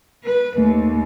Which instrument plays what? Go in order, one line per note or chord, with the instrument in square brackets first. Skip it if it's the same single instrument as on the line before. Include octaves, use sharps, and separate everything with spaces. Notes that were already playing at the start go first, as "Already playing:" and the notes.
[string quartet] B4
[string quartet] D#2 [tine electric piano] A3